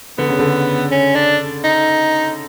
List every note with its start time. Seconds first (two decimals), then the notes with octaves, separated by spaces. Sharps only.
0.18 D3 B3
0.29 C#3
0.39 D3
0.91 C#4
1.15 D4
1.64 D#4